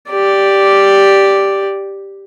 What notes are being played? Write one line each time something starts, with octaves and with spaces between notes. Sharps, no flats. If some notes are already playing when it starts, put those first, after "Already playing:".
G4 D5